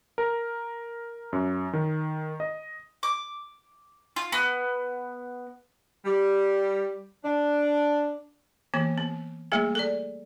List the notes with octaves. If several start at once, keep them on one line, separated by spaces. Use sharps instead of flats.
A#4
F#2
D#3
D#5
D6
F4
B3
G3
D4
E3 A#3 B3
B3
G3 A3 A#3 G#4
A4 D5